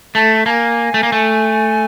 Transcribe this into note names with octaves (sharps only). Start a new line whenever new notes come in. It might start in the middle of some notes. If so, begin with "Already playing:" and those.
A3 A5
A#3 G#5 A5
A3
A#3
A3